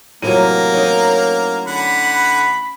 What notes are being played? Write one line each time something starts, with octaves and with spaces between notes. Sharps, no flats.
A2 C3 E3 F#3 A#3 A#5 D#7
C#4 D#4
D3 F#5 B5